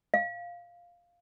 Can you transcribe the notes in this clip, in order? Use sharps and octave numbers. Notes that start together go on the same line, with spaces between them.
F5